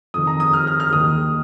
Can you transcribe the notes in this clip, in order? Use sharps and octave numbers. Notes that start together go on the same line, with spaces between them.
F2 D#3 D#6
A#5
D#6
F6
F6
F6
D#2 D#3 D#6